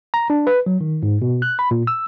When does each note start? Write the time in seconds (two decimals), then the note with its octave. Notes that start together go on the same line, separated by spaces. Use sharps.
0.14 A#5
0.30 D4
0.47 B4
0.66 F#3
0.81 D#3
1.03 G#2
1.22 B2
1.42 F#6
1.59 B5
1.71 A#2
1.87 E6